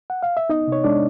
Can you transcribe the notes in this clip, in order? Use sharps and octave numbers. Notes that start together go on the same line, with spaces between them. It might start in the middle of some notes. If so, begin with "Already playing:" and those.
F#5
F5
E5
B3 D#4 D#5
C3 C#5
G#3 D4 D5